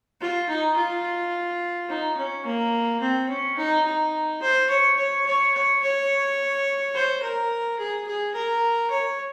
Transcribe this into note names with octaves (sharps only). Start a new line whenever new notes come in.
F4
D#4
F4
D#4
C#4
A#3
C4
C#4
D#4
D#4
C5
C#5
C#5
C#5
C#5
C#5
C5
A#4
G#4
G#4
A#4
C#5